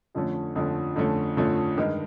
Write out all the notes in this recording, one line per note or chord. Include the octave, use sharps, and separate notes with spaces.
F2 D3 F3 A3 C#4
F2 D3 F3 A3 C#4
F2 D3 F3 A3 C#4
F2 D3 F3 A3 C#4
G2 D#3 G#3